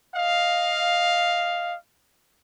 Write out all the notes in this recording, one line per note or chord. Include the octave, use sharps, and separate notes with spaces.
D#5 F5